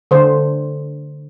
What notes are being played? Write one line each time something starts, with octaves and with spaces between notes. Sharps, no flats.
D3 C5